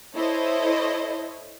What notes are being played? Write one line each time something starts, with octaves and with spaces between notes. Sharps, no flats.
E4 A4 C5 C#5 D#5